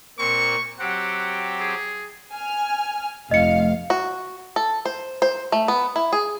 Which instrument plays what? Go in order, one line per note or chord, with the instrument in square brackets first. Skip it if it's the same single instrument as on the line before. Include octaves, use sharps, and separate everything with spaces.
[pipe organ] A#2 A#3 C4 [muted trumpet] C#6
[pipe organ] F#3 C4 G4 [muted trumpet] F#5
[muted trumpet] G#4
[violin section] G#5 F6
[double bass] F1 [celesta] D#5 C#7 [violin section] F5
[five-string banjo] F#4
A4
C5
C5
A3
B3
E4
G#4